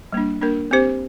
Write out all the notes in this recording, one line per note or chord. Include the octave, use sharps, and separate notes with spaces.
G3 A#3 D4
A#3 D4 A#4
C4 G4 C5